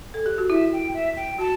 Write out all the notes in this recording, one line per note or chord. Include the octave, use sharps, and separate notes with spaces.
A4
G4
F#4
E4 E5
G5
E5
G5
F#4 A5